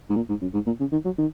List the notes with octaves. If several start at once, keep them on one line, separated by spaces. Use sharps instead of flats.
G#2
A#2
G#2
F#2
G#2
A#2
C#3
D#3
F#3
D#3